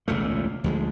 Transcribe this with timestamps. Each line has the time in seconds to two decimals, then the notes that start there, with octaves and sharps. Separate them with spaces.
0.08 E1 C#2 A#2 A3
0.64 D2 F3 G#3